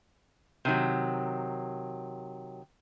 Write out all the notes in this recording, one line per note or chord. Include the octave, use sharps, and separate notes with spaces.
C3 D#3 F#3